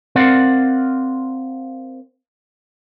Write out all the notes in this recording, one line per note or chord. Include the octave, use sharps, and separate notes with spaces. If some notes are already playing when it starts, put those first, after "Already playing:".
C4 A#4 D5 F5 F#5